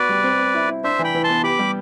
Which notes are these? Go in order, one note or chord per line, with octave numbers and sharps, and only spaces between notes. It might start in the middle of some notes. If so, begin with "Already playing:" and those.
Already playing: B3 F#4 B4 D5
G3
C4
C4
E4
E4
D4 C5 E5
E3
G5 B5
E3
A5 C6
B3
G4 B5 D6
G3